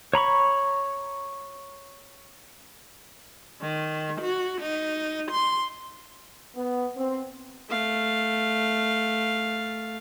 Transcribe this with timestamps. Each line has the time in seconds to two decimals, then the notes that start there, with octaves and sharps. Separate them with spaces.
0.14 C#5 A#5 B5 C#6
3.61 D#3
4.21 F#4
4.61 D#4
5.31 C6
6.55 B3
6.97 C4
7.69 A3 F5